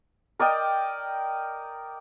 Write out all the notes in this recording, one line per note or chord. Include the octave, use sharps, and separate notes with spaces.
A#4 D5 D#5 G5